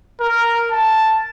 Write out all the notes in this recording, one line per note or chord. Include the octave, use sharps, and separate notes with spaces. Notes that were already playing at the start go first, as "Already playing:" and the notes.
A#4
A5